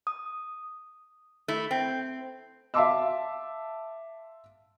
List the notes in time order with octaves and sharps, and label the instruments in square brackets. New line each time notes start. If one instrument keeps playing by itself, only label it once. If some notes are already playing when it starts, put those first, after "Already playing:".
[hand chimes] D#6
[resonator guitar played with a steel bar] A3 E4
C4
[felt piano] E5 F5 A5 C6 D6 E6